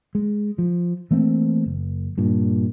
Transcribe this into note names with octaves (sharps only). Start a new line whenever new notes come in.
G#3
F3
E3 A3 A#3 C4
F#1
G2 A#2